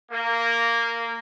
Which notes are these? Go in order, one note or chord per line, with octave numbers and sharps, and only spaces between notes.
A#3